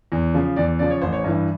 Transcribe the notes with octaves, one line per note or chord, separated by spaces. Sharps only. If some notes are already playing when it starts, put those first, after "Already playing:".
E2
C#3 F3
E2 D5
C#3 F3 D5
C#5
A1 C5
C#5
G2 E3